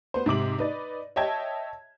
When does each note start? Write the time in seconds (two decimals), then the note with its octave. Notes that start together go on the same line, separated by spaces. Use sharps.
0.14 B3 C5
0.26 G#2 C3 D6 F#7
0.59 D#4 B4 D5
1.16 C#5 D#5 E5 G5 A5 G#6